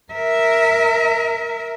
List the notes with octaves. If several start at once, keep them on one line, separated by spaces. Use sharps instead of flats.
A#4 E5